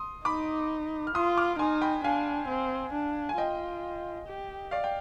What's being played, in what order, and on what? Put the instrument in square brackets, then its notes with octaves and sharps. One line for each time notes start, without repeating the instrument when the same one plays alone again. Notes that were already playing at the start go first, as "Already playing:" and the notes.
Already playing: [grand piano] C6 D#6
[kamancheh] D#4 [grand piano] B5 D6
[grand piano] F6
[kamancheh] F4 [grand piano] C6 D#6
[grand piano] D6 F6
[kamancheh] D#4 [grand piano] G#5 C6
[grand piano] G5 B5
[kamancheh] D4 [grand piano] F5 G#5
[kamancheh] C4
D4
[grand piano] G#5
[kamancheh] F4 [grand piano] D#5 G5
[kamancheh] G4
[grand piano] D5 F5
G5